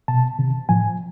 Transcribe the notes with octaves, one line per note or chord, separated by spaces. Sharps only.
B2 A5
C3 D#3
A2 F3 G#5